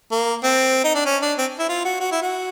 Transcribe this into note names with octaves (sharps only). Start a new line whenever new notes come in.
A#3
C4
D#4
D4
C#4
D4
C4
E4
F4
F#4
F#4
E4
F#4